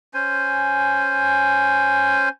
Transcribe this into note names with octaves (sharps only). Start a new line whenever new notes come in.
C#4 C5 G#5